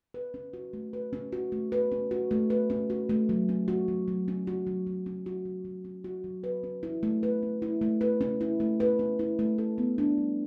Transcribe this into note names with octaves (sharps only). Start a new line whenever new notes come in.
B4
C#4
F#4
A3
B4
C#4
F#4
A3
B4
C#4
F#4
A3
B4
C#4
F#4
A3
F#3
C#4
F#4
F#3
F#3
C#4
F#4
F#3
F#3
C#4
F#4
F#3
F#3
C#4
F#4
F#3
B4
C#4
E4
A3
B4
C#4
E4
A3
B4
C#4
E4
A3
B4
C#4
E4
A3
A4
B3
D4
G3